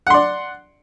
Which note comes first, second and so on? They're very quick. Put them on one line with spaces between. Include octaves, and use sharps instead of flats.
F#5 C6 D5